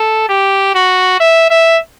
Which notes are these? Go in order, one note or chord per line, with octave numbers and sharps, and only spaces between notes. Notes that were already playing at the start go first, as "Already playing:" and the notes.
Already playing: A4
G4
F#4
E5
E5